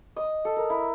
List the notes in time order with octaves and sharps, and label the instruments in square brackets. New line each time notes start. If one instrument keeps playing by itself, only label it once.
[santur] D#5
A4
A#4
E4